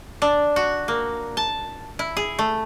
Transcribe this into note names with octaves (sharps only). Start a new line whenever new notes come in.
D4
F#4
A#3
A5
E4
G#4
A3